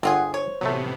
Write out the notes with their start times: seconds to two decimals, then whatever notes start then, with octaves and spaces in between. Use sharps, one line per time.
0.03 G1 C4 F4 G#4 F#5
0.34 C5 C#5
0.61 A1 C3 F#3 A3 B3